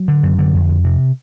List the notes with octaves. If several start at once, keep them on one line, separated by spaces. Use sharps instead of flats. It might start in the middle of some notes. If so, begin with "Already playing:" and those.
Already playing: F#3
D3
F#2
D3
F2
F2
C3